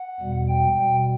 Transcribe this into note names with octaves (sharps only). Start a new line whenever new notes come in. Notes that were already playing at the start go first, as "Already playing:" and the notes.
Already playing: F#5
E2 B2 G3
G5
B2 G3 G5